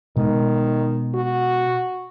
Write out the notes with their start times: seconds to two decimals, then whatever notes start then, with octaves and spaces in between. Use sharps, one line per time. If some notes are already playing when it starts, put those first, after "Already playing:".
0.17 B2 D#3 G#3
1.15 F#4